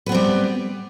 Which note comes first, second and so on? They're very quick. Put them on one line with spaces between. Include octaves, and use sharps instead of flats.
B4 B3 C4 G3